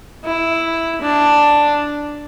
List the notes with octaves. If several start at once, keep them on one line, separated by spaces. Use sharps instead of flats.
E4
D4